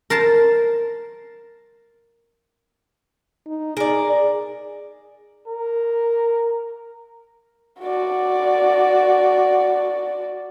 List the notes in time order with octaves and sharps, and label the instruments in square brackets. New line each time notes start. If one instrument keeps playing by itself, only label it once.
[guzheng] A#4 C5 A5
[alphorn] D#4
[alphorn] G#4 [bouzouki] A#4 D5
[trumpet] A#4
[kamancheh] F#4 D5